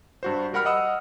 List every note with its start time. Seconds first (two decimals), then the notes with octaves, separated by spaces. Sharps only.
0.23 G2 F#4 C5
0.53 G3 A#4 F#5 B5 F6
0.65 D#5 F#5 D#6 E6